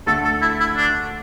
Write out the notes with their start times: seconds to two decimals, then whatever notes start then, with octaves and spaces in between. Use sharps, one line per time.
0.07 D2 D3 A3 A4
0.25 A4
0.42 E4
0.60 E4
0.77 D4